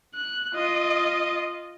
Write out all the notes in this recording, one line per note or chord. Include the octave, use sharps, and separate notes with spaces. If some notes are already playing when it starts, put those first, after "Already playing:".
F#6
F4 D#5